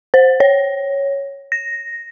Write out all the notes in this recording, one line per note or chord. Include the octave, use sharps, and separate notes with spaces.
C5
C#5
A#6